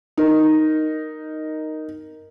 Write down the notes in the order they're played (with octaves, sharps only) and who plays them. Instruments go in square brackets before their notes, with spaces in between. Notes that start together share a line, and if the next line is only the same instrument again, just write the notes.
[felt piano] D#4 A#4